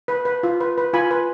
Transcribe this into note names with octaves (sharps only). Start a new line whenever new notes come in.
B4
B4
F4
B4
B4
F4 G#5 B5
B4